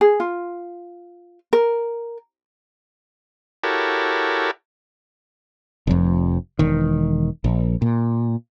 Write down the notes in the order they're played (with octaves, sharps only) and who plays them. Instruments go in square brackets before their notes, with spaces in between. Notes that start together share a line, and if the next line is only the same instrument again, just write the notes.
[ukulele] G#4
F4
A#4
[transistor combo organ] E4 F#4 G4 A4 A#4 C#5
[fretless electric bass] F1 F2
E1 D#3
A#1
A#2